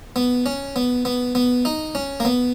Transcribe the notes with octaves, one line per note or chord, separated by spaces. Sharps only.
B3
C#4
B3
B3
B3
D#4
C#4
A#3
B3